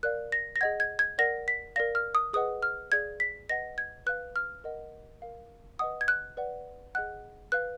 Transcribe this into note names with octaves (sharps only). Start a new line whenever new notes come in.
A#4 D5 F5 F#6
A#6
A#6
G#4 D#5 F#5 G#6
G#6
G#6
A#4 D5 F#5 A#6
B6
A#4 D5 F5 A#6
F6
D#6
G#4 B4 D#5 F#5 D#6
F6
G#4 D5 F5 G#6
B6
B4 D#5 F#5 A#6
G#6
B4 F5 F#6
F6
A#4 D#5 F#5
A#4 F5
B4 D#5 F#5 D#6
G#6
F#6
B4 D5 F#5
G#4 D#5 F#5 F#6
B4 F5 F#6